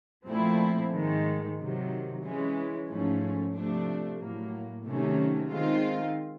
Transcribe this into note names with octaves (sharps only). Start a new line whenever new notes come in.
A#2 F3 A3 C4 E4
G#2 D#3 G#3
C3 D#3 F#3
E3 G#3 C#4
G#2 F3 A3 C#4
C3 F3 A3 D4
A2 F#3 A#3
C3 D#3 F#3 A3 C#4
D#3 G#3 C4 F4